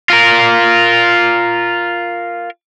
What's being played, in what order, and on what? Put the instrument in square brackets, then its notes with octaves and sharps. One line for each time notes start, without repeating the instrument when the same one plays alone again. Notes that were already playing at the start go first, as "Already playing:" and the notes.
[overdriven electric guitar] F4 A#4